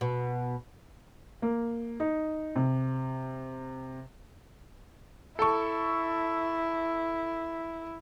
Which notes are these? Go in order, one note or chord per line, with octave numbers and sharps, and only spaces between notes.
B2
A#3
D#4
C3
E4 A4 C#6